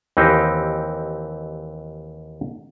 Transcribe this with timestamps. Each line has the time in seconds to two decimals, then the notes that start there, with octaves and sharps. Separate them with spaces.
0.17 D#2 E3 C4 D#4 G4